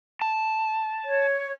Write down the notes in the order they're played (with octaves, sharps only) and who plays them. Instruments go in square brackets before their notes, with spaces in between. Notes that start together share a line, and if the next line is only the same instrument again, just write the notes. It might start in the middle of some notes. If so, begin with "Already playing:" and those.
[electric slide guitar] A5
[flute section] C#5